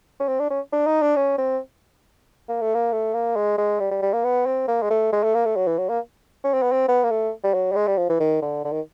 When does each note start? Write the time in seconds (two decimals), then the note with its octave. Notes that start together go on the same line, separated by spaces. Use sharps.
0.20 C#4
0.28 C4
0.39 D4
0.50 C#4
0.73 D4
0.86 D#4
1.02 D4
1.16 C#4
1.38 C4
2.48 A#3
2.61 A3
2.74 A#3
2.92 A3
3.14 A#3
3.36 G#3
3.58 G#3
3.80 G3
3.91 G3
4.02 G3
4.13 A#3
4.24 B3
4.46 C4
4.68 A#3
4.82 G#3
4.90 A3
5.12 G#3
5.23 A3
5.35 A#3
5.45 A3
5.56 F#3
5.67 E3
5.78 F#3
5.89 A#3
6.44 C#4
6.53 C4
6.62 B3
6.72 C4
6.88 B3
7.03 A#3
7.11 A3
7.44 G3
7.54 F#3
7.72 G3
7.76 G#3
7.87 G3
7.98 F3
8.09 E3
8.20 D#3
8.42 D3
8.64 D3
8.72 D#3